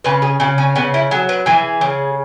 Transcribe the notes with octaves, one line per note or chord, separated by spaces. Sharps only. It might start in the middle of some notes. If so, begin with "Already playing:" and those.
C#3 B4
G#4
C#3 F#4
C#4
C#3 B3
E4
F#3 G#4
B4
E3 G#4
C#3